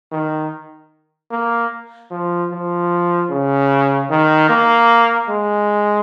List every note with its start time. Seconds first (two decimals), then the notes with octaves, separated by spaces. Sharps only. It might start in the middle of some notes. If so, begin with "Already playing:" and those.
0.11 D#3
1.31 A#3
2.11 F3
2.51 F3
3.30 C#3
4.10 D#3
4.49 A#3
5.29 G#3